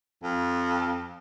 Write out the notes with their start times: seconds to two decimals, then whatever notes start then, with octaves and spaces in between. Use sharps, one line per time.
0.23 F2